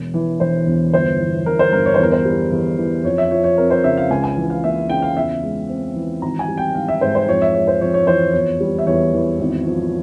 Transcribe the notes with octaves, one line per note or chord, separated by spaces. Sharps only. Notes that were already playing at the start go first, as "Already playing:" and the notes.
Already playing: E1
E3
E1 C5
E2
G1 C5
E3
G1 A#4
C5
G2 A#4
C#5
C5
E2 A#4
C5
G3
E2
E3
F2 C#5
E5
F3 C#5
C#5
C4 A#4
C5
C#3 E5
F5
C#2 G#5
G#5
E3
F5
A#3 E5
C#3 G5
F5
E2 E5
G#3
C4
E3
G#1 A#5
G#5
G3
G5
G#1 F5
E5
G#2 C5
C5
F2 C#5
E5
G#3 C#5
C5
F2 C#5
C#5
E3 C5
E2 C#5
G3
E5
E2 C#5
E3
G#1
F3